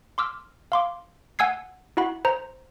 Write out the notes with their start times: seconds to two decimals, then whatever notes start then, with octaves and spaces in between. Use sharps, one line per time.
0.18 C6 D6 E6 F6
0.72 F5 C6 D6
1.39 F#5 G#5 E6 G#6 C7
1.97 E4 F#4 F#5 B5
2.25 C5 A#5